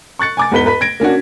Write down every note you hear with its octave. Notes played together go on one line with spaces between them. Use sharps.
C#6 F#6 A6 C#7
G#5 D6 A6
E2 G#2 B4 B6 G7
B4 B5 B6
G#6 A#6 D7
A#3 C#4 D4 F#4